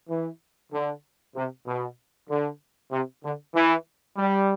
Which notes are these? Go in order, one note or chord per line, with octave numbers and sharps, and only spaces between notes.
E3
D3
C3
B2
D3
C3
D3
E3
G3